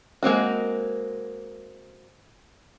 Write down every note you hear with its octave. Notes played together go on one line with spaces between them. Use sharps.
G#3 A#3 C4 F#4